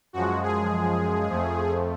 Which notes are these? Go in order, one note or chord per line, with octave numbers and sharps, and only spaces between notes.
F#2 F3 G#3 F#4
G#4
F2 F3 A3